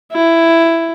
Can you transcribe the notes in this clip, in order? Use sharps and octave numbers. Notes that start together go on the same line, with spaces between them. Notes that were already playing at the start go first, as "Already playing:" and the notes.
E4